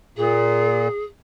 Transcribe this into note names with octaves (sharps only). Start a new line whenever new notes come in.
A#2 G#4